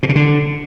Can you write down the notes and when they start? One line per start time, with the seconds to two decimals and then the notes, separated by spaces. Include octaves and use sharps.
0.03 B2
0.09 C#3
0.15 D3